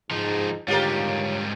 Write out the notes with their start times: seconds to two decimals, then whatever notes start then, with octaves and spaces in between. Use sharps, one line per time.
0.11 G#2 F3 D#4
0.68 G#2 D3 D#3 G3 F4 G4 A#4 C#5